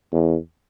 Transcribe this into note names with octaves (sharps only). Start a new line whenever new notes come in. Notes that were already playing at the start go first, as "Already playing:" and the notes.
E2